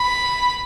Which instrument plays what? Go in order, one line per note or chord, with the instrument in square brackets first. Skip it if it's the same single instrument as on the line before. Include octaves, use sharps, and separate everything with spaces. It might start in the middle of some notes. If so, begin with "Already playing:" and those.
Already playing: [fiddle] B5